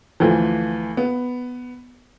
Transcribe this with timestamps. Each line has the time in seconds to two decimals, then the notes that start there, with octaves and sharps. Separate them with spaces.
0.20 D2 E3 F3
0.97 B3